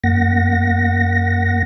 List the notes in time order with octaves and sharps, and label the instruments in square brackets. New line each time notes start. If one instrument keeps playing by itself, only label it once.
[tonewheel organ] F#2 A#3 F#5 A#6